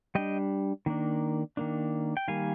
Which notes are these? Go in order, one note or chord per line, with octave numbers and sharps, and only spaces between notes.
G3 D4 D#5 G5
D#3 A#3 D4
D#3 A#3 D4
G5
D#3 G3 A#3 F5 G#5